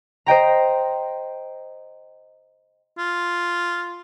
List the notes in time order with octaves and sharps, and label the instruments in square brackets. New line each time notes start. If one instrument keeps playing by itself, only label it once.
[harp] C5 D#5 G5 A#5
[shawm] F4